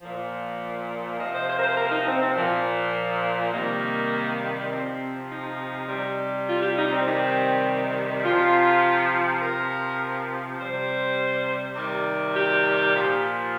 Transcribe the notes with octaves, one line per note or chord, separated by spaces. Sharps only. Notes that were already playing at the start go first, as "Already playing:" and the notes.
A#2 F3
C3 F3 D#5
C5
C5
A#4
C5
A#4
D#4
C4
C4
A#2 F3
C3 D#3 G3 A#3
C3 F3 C4
D#4
C3 G3
F4
G4
D#4
C4
C3 D#3 G3
C3 F3 F4
C3 F3 A#4
C3 G3 C5
C3 D#3 G3
G4
A#2 F3